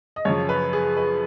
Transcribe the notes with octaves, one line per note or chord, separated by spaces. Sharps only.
D#5
F#2 C#3 F3 C#5
B4
G#4
B4